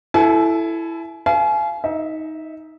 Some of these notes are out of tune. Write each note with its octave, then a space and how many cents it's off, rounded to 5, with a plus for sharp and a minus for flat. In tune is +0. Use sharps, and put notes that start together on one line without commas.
E4 +10 A4 +0 G#5 +35
F5 -30 G#5 +40
D#4 +15 E5 -10